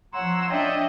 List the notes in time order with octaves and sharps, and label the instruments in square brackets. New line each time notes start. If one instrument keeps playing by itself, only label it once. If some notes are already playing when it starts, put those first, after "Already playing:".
[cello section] F3 C#5 [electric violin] F#5 E6 [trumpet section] A#5 C6
[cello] D4 [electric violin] D#5 [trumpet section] E5 G5